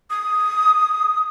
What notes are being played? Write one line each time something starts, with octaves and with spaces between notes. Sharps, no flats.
D#6